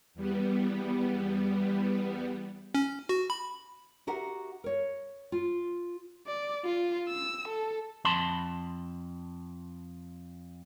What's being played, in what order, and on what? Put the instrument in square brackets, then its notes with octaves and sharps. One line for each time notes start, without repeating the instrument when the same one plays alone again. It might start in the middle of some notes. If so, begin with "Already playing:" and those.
[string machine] E2 G3 B3
[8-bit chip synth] C#4
F#4
B5
[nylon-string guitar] F#4 G4 A#4 E5 F#5
A#4 C#5
F4
[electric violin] D5
F4
E6
A4
[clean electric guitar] F2 A5 B5 C6